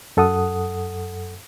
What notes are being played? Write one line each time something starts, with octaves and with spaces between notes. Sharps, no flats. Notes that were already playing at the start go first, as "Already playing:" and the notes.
F#2 A4 F#5 D#6